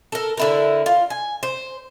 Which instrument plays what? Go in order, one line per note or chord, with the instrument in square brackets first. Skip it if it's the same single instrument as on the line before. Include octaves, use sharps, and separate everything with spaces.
[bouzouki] A4 A#4
D3 E4 A#4
F4
G#5
C5